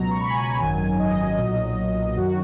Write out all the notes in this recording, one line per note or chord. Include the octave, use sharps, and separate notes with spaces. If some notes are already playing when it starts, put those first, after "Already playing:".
Already playing: C#2 B2 F#3 A#5
C#6
B5
G#5
B5
G#1 F#2 D#3 F#3 G#5
D#5
B1 A#2 F#3
F#2 D#3 F#3 F#4